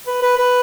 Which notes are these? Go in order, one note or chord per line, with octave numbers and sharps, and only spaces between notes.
B4
B4
B4